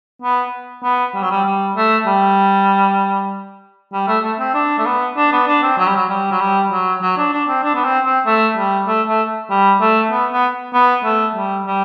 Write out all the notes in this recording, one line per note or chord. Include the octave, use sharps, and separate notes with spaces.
B3
B3
G3
F#3
G3
G3
A3
G3
G3
A3
A3
C4
D4
A3
B3
D4
B3
D4
C4
F#3
G3
F#3
G3
F#3
G3
F#3
F#3
D4
D4
C4
D4
B3
C4
C4
A3
G3
A3
A3
G3
A3
B3
B3
B3
A3
G3
G3